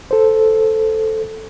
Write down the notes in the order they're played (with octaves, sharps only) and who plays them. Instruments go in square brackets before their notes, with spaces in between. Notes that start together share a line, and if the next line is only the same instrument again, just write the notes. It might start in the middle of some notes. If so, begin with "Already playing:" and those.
[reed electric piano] A4 C5